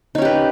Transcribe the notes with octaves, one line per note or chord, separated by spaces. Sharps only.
C#4 D#4 G4 B4